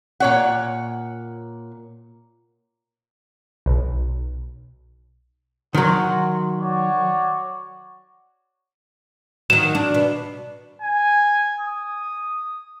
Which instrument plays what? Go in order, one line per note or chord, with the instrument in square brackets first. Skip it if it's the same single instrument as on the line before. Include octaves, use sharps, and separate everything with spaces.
[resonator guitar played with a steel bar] A#2 C#5 F#5
[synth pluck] B1
[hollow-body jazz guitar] D#3 F#3 [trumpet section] F#4 C6
[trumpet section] F#4 C#5 D5
[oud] D#3 F#3 [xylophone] E7
[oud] D4
B2
[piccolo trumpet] G#5
D#6